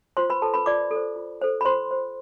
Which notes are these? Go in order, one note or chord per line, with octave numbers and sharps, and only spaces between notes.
F4 C5 C6
B4 B5
A4 B4 A5
B4 B5
F4 D5 D6
A4 C5
F4
A4 C5
B5
F4 C5 C6
C5